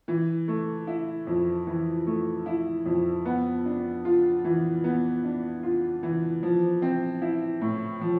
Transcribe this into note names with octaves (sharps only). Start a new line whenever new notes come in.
E3
A3
E4
F2
E3
A3
E4
F2
B3
D4
F4
E3
B3
D4
F4
E3
F3
C4
E4
A2
F3